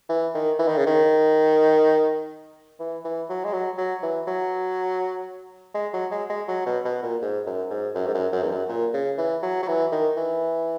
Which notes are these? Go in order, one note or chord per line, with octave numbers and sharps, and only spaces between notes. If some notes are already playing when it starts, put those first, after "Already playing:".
E3
D#3
E3
D#3
C#3
D#3
E3
E3
F#3
G#3
F#3
F#3
E3
F#3
G#3
F#3
G#3
G#3
F#3
B2
B2
A#2
G#2
F#2
G#2
F#2
G#2
F#2
F#2
E2
F#2
A#2
C#3
E3
F#3
F#3
E3
D#3
E3